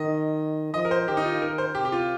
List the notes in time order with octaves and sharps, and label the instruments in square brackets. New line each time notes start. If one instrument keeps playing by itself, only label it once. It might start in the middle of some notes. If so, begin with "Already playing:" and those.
Already playing: [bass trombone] D#3 [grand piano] D#5
[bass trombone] F3 [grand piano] D#5
[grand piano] A#4
C5
[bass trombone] D#3 [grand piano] G4
[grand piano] D#4
F4
[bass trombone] D#3 [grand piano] A#4
[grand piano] C5
[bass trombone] C3 [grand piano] G4
[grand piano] G4
F4